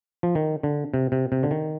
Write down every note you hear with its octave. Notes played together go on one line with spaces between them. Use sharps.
F3
D#3
D3
C3
C3
C3
D3
D#3